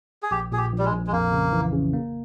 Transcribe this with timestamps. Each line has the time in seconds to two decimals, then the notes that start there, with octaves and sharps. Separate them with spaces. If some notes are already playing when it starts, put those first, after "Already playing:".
0.23 G#4
0.31 A#1 G4
0.52 A#2 G#4
0.58 G4
0.72 A#1
0.79 G3
0.85 G#3
0.92 A#1
1.07 G#3
1.12 F2 A#3
1.32 C#3
1.52 E3
1.73 C#3
1.93 A#3